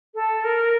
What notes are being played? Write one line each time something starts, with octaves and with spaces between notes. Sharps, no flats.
A4
A#4